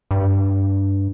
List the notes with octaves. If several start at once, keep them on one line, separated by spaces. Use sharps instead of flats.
G2